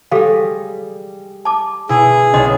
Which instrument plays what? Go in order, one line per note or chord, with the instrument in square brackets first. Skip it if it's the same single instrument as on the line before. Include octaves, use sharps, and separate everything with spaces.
[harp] G3 G#3 [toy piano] G4 A4 F5
[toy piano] A5 D6
[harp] B2 E4 [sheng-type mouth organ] G#4
[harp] B1 B2 [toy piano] C#4 D#5 C6